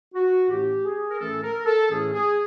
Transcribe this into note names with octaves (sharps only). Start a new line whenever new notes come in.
F#4
A2 E3 A3 C#4 G4
G#4
A#4
A2 E3 A3 C#4 A4
A#4
A4
A2 E3 A3 C#4 G#4
G#4